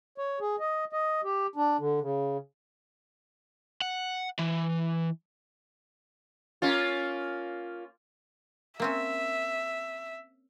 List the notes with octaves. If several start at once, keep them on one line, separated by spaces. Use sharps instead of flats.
C#5
G#4
D#5
D#5
G4
D4
D3
C#3
F#5
E3
A#3 C#4 F4
A#3 C4 C#4 E5